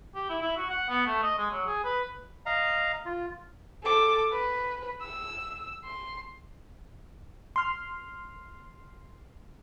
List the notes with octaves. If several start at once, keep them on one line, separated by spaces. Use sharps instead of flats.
G4
E4
E4
F#4
F#5
B3
A3
D#5
G#3
F#3
G#4
B4
D#5 F5 A#5
F4
A4 D6
B4
E6
C6
C6 F6